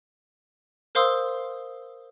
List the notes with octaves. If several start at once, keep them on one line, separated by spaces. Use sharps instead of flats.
A#4 C5 F5 C6 D#6 E6